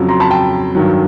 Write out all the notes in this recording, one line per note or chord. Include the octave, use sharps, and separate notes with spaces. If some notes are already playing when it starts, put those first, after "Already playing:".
Already playing: F2 C#3 F#3
A#5 C6
A5 B5
G5 A5
G2 D#3 F#3